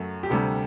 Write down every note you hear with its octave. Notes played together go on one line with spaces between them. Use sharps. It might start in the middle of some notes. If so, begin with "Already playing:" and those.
Already playing: F#2 F#3 A3
G4
D2 C3 G3 A4